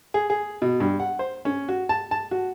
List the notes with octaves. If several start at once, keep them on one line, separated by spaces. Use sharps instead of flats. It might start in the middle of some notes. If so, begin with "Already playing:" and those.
G#4
G#4
B2
G2
F#5
C5
C#4
F#4
A5
A5
F#4